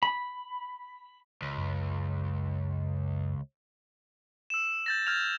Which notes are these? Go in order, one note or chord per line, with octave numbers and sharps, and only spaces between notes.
B5
C#2
F#2
E6 E7
G6 A6 A#6
F6 G6 G#6 F7